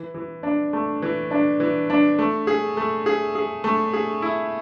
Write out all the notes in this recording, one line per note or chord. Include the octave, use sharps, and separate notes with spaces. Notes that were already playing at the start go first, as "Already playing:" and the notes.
Already playing: E3
E3
D4
A3
E3
D4
E3
D4
A3
G#4
A3
G#4
G#4
A3
G#4
E4